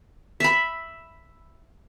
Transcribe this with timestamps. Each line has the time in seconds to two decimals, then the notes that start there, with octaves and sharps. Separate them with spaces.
0.40 E5 B5